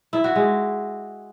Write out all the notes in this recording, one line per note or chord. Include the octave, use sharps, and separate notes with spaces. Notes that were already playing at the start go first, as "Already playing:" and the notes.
E4
F#4
G#3